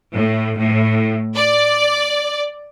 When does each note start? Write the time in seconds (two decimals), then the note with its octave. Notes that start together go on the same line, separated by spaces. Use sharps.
0.13 A2
0.58 A2
1.35 D5